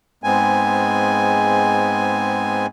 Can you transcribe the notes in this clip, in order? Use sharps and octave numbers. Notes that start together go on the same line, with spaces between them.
G#2 G#3 B3 C4 G#5